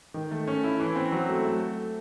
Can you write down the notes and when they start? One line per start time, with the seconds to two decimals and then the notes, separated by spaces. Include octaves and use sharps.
0.14 D#3
0.31 A3
0.48 C#4
0.64 E4
0.80 E3
0.96 C4
1.12 F#3
1.29 A3
1.45 A3